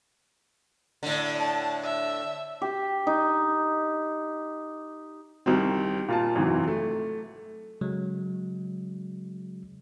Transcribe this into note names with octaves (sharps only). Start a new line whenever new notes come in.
A2 D3
A5
E5
G4
D#4
C2 D#3 C4
A#2 F4 A5
G#1 F#2 C3 E3
A3
C#3 F#3 G#3